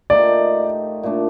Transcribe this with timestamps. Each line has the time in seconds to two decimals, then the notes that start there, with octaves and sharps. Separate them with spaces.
0.10 A#2 A3 D#4 G4 D5
1.03 A#2 A3 D4